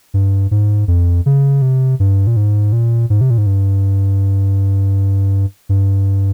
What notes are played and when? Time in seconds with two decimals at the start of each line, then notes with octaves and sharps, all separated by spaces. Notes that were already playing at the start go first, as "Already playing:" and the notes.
0.14 G2
0.51 G#2
0.88 F2
1.26 C#3
1.62 C3
2.00 G2
2.27 A#2
2.36 G#2
2.72 A#2
3.10 G#2
3.21 C3
3.30 A#2
3.38 G#2
3.46 G2
5.69 G2